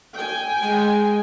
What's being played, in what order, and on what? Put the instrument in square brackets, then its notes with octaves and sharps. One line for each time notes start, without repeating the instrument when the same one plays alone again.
[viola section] G5 G#5
[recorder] G#3